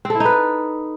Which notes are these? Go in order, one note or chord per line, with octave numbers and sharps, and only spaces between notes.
C4
A4
E4
D#4
B4